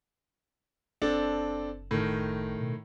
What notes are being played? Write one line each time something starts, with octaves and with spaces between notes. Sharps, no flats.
F#1 C4 D4 A4
A2 D#3
B2